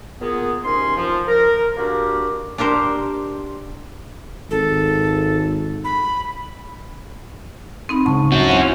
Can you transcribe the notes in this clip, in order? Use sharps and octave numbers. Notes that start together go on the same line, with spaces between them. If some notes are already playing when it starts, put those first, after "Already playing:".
A#2 B3 G#4
C2 D#3 C#4 C6
F3
A#4
D3 A#3 D4 F#4 G4
D4 G4 A#4 C5
G#1 A4
B5
C4 D#4 B5
D2 G#2 C#3 A5 C#6
C#4 F#4
E4 C5 F5 F#5 G#5